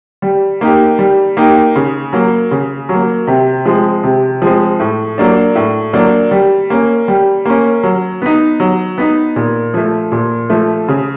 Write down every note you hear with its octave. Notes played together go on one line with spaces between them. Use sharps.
G3
A#3 D#4 G4
G3
A#3 D#4 G4
C#3
F#3 A#3
C#3
F#3
A#3
C3
F3 G#3 C4
C3
F3 G#3 C4
A2
F#3 A#3 D4
A2
F#3 A#3 D4
G3
A#3 C#4
G3
A#3 C#4
F#3
B3 D#4
F#3
B3 D#4
A#2
F3 A3
A#2
F3 A3
C#3